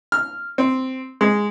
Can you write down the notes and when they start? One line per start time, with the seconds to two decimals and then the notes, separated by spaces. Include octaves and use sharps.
0.12 F6
0.58 C4
1.21 G#3